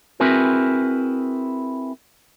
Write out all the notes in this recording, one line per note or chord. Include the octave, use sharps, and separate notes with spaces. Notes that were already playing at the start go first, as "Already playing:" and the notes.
C4 E4 F#4 G#4 A#4 B4